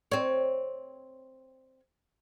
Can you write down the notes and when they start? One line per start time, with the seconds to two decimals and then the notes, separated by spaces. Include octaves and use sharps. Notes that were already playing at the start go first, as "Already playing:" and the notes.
0.12 C4 C#5